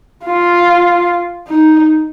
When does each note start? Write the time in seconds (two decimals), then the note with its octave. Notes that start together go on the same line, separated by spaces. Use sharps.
0.25 F4
1.48 D#4